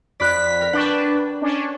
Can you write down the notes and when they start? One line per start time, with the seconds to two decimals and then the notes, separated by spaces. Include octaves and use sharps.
0.20 F2 D5 B5 F#6 B6
0.61 A#4
0.73 D4 B4 F#5 G5 C#6
1.42 C#4 D4